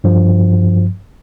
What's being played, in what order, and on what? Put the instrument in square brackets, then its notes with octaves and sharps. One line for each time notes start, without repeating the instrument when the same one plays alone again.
[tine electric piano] G2 F3